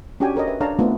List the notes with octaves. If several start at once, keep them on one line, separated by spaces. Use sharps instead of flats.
C#4 D4 F#4 G4 G5 G#5
A4 A#4 C#5 D#5
B4 E5
D4 A4 C#5 F5 A5 A#5
A3 B3 C4 D#4 F4